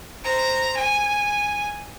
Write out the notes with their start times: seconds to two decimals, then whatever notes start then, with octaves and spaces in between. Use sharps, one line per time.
0.23 C5 A#5
0.76 G#5